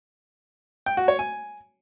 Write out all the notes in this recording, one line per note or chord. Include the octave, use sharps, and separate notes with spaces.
G5
F#4
C#5
G#5